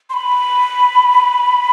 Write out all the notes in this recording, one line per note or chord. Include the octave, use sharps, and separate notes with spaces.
C6
B5